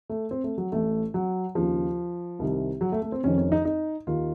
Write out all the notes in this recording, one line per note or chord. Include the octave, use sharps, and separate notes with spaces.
A3
C4
A3
F#3
A1 A2 A3
F#3
D#2 C#3 F3
C2 C3 D#3
F#3
A3
A3
C4
F1 F2 D#3 C#4
C#4
D#4
D#4
D#2 D#3 F4